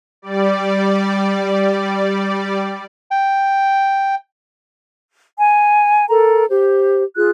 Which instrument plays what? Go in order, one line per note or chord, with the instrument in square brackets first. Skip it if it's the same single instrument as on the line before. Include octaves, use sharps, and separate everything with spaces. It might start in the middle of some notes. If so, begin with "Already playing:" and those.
[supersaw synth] G3 D5
[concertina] G5
[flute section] G#5
A4 A#4 A#5
G4 C5
F4 G#4 F#6